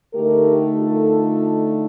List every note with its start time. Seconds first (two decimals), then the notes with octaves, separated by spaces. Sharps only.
0.14 D3 A3 D#4 G4 A#4
0.76 F4 A4